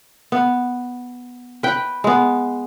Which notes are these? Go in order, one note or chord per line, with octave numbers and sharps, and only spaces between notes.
B3
B4 G5
G#3 B3